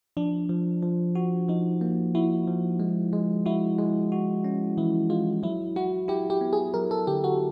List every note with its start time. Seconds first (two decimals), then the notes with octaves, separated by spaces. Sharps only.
0.17 F3 D4
0.49 F3
0.82 F3
1.15 F#4
1.48 F3 D#4
1.81 A#3
2.15 E4 F#4
2.48 F3
2.80 G#3
3.13 G#3
3.46 E4 F#4
3.78 G#3
4.12 F#4
4.44 C#4
4.77 E3 E4
5.10 G#3 F4
5.43 F#3 E4
5.76 E4 F#4
6.08 E4 G4
6.30 G4
6.41 B3
6.53 G#4
6.74 F#3 A#4
6.91 A4
7.07 D3 G4
7.24 F#4